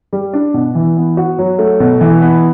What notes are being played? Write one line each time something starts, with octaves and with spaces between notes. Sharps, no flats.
G3
D4
B2
E3
B3
F#4
F#3
A3
B2
E3
B3